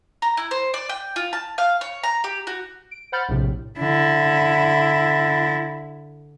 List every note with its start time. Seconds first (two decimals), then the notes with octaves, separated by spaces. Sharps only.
0.22 A#5
0.37 E4
0.51 C5
0.74 D5
0.89 G5
1.16 F4
1.33 A5
1.58 F5
1.81 C#5
2.03 A#5
2.24 G4
2.47 F#4
2.91 D7
3.12 C5 F#5 B5 F6 G6 A6
3.29 A#1 A2 C3
3.80 D3 E4